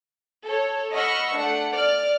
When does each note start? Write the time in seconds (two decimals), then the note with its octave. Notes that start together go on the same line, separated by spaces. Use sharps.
0.44 A4 C#5
0.92 D#5 F#5 B5 C#6 E6 F6
1.34 A3 D4 F#5 C#7
1.72 D5 F6